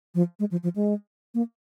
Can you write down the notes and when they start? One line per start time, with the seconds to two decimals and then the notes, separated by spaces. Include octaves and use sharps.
0.15 F3
0.40 G#3
0.51 F3
0.63 F3
0.76 G#3
1.34 A#3